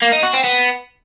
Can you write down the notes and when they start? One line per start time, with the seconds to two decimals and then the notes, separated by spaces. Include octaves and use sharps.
0.02 A#3
0.12 D#4
0.23 F#4
0.33 C4
0.44 B3